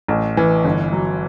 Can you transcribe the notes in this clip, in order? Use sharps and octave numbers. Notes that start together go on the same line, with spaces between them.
A1
E3
G1
F#3